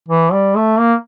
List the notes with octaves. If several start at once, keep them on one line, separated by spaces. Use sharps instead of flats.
E3
G3
A3
A#3